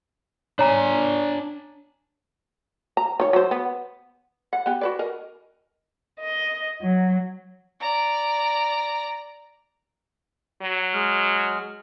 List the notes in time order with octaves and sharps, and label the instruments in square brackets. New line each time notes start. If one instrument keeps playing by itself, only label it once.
[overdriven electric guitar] D4 G#5 [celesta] C#5 A#5
[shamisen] A#5
D#3 C#5
F#3 C5
B3
F#5
B3 G4
F#4 B4 D5
A#4 D#5
[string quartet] D#5
F#3
[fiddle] D5 A#5
[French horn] F#3
[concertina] G#3 F6